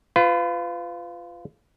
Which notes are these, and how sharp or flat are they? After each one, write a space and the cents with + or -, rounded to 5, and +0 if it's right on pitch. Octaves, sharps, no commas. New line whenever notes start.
F4 -5 B4 +35